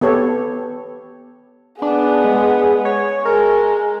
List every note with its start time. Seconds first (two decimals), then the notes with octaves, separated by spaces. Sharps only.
0.01 B3 G4 A4 C#5
1.82 B3 D4 G#4
2.24 G#3
2.85 C#5
3.25 G#3 A#4